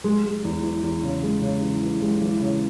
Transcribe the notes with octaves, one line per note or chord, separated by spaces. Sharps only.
G#3
G#3
E2
E3
E2
C#3
G#3
C#3
E3
E3
G#3
E3
C#3